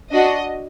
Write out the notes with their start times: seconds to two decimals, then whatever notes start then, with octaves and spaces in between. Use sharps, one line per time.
0.12 D4 F#4 D#5